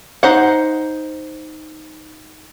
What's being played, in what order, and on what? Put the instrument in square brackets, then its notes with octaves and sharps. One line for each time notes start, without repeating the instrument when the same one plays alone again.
[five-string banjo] D#4 C5 F#5